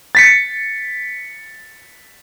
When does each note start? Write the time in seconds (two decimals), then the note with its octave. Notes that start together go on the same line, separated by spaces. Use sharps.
0.15 A6 B6 C#7